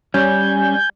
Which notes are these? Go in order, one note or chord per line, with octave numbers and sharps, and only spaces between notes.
G3 C#4 G#5 G6